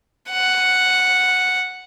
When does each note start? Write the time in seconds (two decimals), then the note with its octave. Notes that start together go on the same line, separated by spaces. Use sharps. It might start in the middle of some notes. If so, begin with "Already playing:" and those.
0.31 F#5